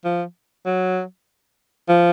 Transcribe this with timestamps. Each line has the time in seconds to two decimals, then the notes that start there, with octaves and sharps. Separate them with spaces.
0.05 F3
0.66 F#3
1.89 F3